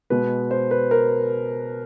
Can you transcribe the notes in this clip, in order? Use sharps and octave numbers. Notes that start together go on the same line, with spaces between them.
B2 G#3 B4
C5
B4
A#4